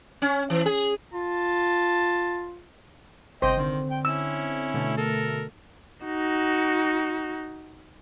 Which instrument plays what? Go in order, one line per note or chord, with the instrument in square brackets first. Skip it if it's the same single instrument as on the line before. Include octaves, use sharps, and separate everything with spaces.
[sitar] C#4
E3
G#4
[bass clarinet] F4 [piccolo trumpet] A5
[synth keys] G1 C3 [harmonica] C4 D#5 G5 [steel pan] C5
[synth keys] D3 C4 [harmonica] D#3
[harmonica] G5
[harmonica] C#4 E4 [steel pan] E6
[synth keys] B2 D3 A3
[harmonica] A4 A#4
[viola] D#4 F#4